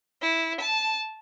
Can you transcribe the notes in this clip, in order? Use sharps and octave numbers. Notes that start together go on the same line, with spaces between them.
E4
A5